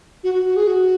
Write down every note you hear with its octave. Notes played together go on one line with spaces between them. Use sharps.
F#4
F#4
F#4
G#4
F#4